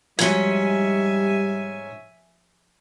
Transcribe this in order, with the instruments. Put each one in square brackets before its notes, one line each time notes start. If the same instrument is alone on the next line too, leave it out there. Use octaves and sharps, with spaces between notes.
[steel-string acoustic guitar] G#2 C#4 [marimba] F3 F#4 [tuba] G3 [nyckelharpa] E5 G#5